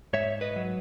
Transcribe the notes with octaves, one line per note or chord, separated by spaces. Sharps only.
G#2 C#5 E5
B4 D#5
F#3